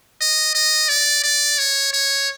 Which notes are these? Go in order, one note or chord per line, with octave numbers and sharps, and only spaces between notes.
D#5
D#5
D5
D5
C#5
C#5